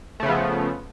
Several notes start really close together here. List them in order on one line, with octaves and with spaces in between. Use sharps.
A3 C#3 B3 F3